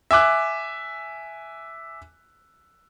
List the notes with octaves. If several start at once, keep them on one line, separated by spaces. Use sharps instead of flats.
E5 G#5 D6 F#6